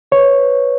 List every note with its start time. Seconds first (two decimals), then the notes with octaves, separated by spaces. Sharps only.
0.12 B4 C#5
0.39 B4